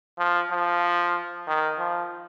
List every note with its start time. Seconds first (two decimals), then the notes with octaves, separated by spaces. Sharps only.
0.18 F3
0.51 F3
1.47 D#3
1.79 F3